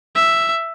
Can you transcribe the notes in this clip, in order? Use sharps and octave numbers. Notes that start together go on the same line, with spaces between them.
E5